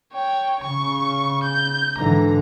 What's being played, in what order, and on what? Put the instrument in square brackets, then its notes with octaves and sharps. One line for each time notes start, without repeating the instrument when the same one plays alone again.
[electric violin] C#5 G5
[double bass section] C#3 [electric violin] C#6
[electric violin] G6
[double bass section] G#2 D3 E3 [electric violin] A#5